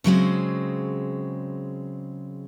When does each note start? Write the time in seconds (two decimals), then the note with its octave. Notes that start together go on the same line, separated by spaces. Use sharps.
0.04 C#3 F#3 G#3 C4